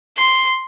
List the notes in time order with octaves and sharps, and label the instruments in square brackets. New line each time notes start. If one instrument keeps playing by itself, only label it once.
[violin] C6